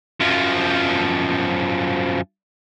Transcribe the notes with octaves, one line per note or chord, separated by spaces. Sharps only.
F#2 F3